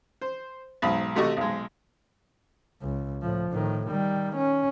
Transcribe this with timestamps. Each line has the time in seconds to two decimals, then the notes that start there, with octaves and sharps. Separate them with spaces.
0.21 C5
0.82 B1 G#2 B5
1.16 C3 A3 F#4 G4 D#5 C#6
1.37 B1 G#3
2.82 C#2
3.22 A2 F3
3.50 A2 D#3
3.88 D#3 G3
4.36 C#4